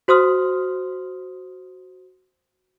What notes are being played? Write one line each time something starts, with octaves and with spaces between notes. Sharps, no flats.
F#4 C5 C6 D#6 F6